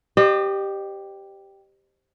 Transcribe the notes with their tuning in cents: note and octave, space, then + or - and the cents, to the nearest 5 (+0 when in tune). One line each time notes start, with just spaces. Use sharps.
G4 +0 C5 +0 D#5 -40